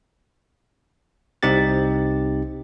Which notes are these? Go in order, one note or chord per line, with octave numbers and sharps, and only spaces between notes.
C2 C4 D#4 G4 A6